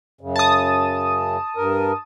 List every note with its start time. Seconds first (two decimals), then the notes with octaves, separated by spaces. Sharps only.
0.21 F#2 C#3
0.36 A5 D#6
1.57 G2 A#4